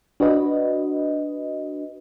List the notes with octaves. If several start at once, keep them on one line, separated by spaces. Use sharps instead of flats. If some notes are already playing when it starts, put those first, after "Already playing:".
D4 F#4 B4 D#5